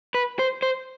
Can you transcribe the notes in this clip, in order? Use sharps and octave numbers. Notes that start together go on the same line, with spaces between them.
B4
C5
C5